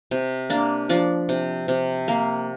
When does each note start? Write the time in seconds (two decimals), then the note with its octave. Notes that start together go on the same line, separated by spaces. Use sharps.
0.11 C3
0.50 A#3 D4
0.89 F3 D4
1.29 C3
1.68 C3
2.08 A#3